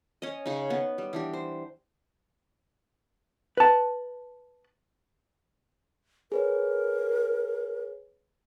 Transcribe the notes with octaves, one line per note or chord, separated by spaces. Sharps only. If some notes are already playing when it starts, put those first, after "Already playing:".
C#4 D#5
C#3 D#4
B3
G3
E3 D4 G4
C5
B4 A5
G#4 A#4 B4 C#5